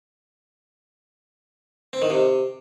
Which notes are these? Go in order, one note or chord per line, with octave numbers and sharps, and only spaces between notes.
C4
D#3
C3